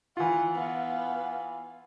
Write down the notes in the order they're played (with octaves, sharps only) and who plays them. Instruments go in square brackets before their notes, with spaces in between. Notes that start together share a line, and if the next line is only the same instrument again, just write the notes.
[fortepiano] E3 F4 [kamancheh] F#5
[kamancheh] B3 F5